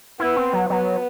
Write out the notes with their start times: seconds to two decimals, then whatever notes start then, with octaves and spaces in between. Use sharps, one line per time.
0.20 B3 E4
0.37 C4
0.53 F#3
0.70 F#3 B3